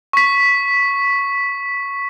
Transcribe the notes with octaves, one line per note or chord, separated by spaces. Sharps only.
C#6 B6